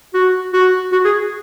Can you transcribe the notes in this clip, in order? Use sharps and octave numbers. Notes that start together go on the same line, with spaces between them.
F#4
F#4
F#4
G#4